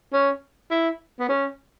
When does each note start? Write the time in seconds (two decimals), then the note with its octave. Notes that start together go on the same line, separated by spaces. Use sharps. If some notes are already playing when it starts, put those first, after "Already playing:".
0.13 C#4
0.71 E4
1.20 B3
1.29 C#4